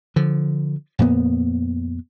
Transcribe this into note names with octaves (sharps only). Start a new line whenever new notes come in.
D3 F3
F2 A#2 A#3 B3